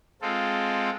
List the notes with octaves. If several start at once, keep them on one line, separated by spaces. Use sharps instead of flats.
G#3 C4 F4 A4